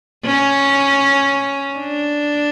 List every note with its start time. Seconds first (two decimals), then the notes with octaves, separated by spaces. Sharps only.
0.25 C#4
1.78 D4